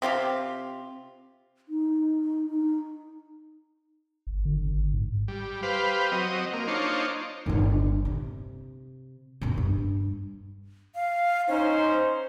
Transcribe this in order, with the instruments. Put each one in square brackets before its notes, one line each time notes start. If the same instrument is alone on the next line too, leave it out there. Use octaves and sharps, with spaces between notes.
[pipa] C3 C4 F4 G4
[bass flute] D#4
D#4
[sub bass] G1
D3
G#1
G#1
G#2
[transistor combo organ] G3
G4 B4 C5 F5
F#3 C4 D#5
A#3
D4 D#4 F4 C5 C#5
[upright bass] G1 D3
C3
F#1 B2
G2
[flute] F5
[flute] C#4 [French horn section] D#4 C5